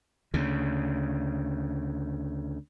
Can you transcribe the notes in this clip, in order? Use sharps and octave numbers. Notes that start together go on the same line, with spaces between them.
D2 C#3